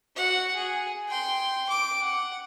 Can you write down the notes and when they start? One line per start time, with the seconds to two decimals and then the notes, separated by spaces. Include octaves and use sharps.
0.16 F#4 F#5
0.55 G#4
1.08 G5 C6
1.69 D6
2.00 F#5